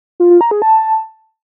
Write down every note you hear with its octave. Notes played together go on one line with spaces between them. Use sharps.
F4
F4
A#5
G#4
A5